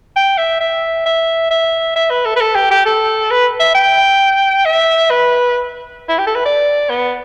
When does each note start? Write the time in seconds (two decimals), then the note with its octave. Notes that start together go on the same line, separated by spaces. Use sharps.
0.16 G5
0.38 E5
0.61 E5
1.06 E5
1.51 E5
1.96 E5
2.10 B4
2.26 A4
2.36 B4
2.41 A4
2.55 G4
2.71 G4
2.86 A4
3.31 B4
3.60 E5
3.75 G5
4.65 E5
5.10 B4
6.09 E4
6.18 G4
6.27 A4
6.36 B4
6.45 D5
6.90 B3